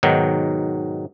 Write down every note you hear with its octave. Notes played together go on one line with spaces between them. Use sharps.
G#2 B2 D#3 F#3